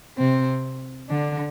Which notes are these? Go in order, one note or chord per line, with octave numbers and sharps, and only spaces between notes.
C3 C4
D3 D4